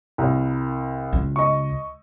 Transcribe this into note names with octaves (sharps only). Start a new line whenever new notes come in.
C2
C#2
D#5 C#6